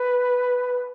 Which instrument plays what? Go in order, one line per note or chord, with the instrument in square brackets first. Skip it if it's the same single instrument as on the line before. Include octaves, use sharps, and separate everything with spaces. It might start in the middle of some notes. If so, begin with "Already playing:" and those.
Already playing: [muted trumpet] B4